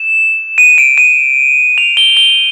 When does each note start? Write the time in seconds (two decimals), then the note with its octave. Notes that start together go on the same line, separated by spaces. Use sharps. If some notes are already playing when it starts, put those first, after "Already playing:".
Already playing: E7
0.58 D#7
0.78 D7
0.98 D#7
1.78 F7
1.97 G7
2.17 G7